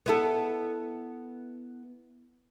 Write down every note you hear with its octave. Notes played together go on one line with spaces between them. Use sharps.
B3 E4 A4